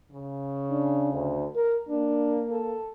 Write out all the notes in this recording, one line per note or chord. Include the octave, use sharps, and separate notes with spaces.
C#3
D4
D2
A#4
A#3 D4
A4